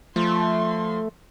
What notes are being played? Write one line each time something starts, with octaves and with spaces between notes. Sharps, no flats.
F3 A3 C6